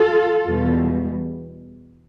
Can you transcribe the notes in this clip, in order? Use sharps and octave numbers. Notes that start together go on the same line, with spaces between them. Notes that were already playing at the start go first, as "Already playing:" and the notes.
Already playing: F4 A4
E2 B2 G3